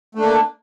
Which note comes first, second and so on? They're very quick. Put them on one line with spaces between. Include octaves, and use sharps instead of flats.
A3 D4 A#3